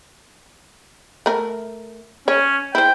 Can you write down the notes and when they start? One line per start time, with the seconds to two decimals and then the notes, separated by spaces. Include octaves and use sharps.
1.26 A3 A#4
2.28 C#4 C#5
2.75 E4 C5 G5